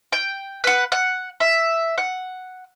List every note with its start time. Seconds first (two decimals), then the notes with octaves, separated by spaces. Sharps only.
0.12 G5
0.64 B4 F#5
0.92 F#5
1.40 E5
1.98 F#5